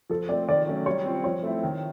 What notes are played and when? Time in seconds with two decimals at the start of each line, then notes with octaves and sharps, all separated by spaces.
0.10 F3 A4
0.29 C4 D5
0.31 A3
0.48 D#3 D5
0.67 F#3 A3 C#4 F#4
0.86 G3 C#5
1.06 C4 F4
1.24 F3 C#5
1.43 A3 C4 E4
1.63 D#3